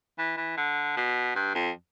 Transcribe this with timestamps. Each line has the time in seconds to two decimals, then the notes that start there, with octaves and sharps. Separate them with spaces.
0.18 E3
0.37 E3
0.57 D3
0.97 B2
1.35 G2
1.55 F2